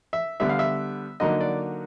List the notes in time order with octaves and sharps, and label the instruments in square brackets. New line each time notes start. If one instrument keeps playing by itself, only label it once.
[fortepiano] E5
D3 G3 B3 E5
F5
E5
D3 F#3 A#3 D#4 D#5
D5